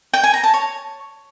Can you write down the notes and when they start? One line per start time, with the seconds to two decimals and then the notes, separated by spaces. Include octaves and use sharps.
0.14 G5
0.24 G#5
0.34 A#5
0.44 A5
0.54 C#5